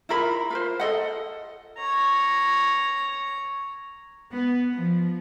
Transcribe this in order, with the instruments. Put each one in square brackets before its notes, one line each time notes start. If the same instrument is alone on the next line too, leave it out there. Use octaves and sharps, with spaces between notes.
[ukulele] E4 F4 A#4 B5
F4 A#4 C5
A4 D#5 F#5
[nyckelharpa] C#5 A#5
[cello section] B3
F3